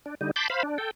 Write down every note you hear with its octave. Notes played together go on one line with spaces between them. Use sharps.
D4
D3 G3 D#4
A5 B5 C6 D6 G6
C5 F5 B5
D4
A4 G5